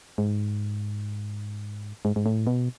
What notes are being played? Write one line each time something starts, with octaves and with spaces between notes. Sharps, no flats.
G#2
G#2
G#2
A2
B2